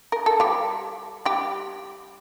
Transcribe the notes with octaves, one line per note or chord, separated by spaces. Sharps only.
A#4
A4
G3 G4
G3 G4